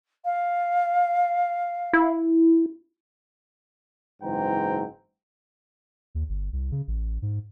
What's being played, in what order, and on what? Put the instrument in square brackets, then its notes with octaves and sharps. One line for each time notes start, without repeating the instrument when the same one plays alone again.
[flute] F5
[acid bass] E4
[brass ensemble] F#1 G#2 E3 C4 G5 A#5
[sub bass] D#2
G1
C2
C#3
A1
G#2